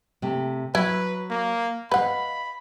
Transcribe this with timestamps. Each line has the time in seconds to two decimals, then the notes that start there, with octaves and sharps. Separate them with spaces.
0.22 C3 A3
0.75 F#3 E4 B4
1.30 A#3
1.91 B4 D#5 F5 F#5 B5